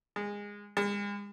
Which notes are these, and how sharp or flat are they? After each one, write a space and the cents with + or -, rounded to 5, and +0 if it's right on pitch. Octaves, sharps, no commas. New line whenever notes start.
G#3 -20
G#3 -40